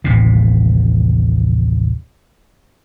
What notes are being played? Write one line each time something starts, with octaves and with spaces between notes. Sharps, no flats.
A1 D#2 A2 C3